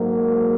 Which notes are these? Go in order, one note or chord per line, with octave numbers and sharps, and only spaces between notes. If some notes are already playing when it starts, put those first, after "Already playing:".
Already playing: G#2 F#3 A#3